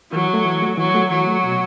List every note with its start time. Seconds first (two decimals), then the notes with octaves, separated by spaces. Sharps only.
0.12 E3 F#3
0.28 F#4
0.34 A3
0.45 E3
0.62 A3 F#4
0.77 E3 F#3
0.94 A3 F#4
1.10 E3 F#3
1.27 A3 F#4
1.43 B2